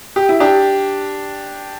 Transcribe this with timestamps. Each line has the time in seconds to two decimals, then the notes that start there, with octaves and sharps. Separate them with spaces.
0.16 G4
0.29 E4
0.40 D4 G4